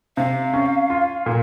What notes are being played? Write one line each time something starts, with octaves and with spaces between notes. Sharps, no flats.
C3 F5
C#4
F4
A#2